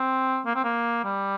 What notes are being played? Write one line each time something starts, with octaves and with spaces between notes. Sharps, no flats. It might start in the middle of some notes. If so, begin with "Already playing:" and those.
Already playing: C4
A#3
C4
A#3
G3